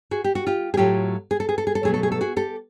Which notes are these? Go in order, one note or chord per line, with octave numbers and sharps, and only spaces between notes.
F#4 G#4
G4
F#4
F4 G4
G#4
A2 F#3 A3 F4 G4
G#4
A4
G#4
A4
G#4
A4
B2 F#3 A3 G#4
A4
G#4
A4
F#4 G#4
G4 A4